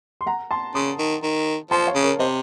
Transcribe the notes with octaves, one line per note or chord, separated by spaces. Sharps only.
C6
F#5 A#5
A5 C6
C#3 C6 D#6
D#3
D#3
F3 A5 C6
C#5 F5
C#3
A#4 C#5
C3 C5 D#5